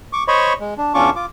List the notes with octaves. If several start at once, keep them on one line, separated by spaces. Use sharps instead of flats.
C#6 D6
C5 C#5 D#5 B5 C#6
G#3
D4
E2 C#4 D4 F4 C#6 D6
F4 D6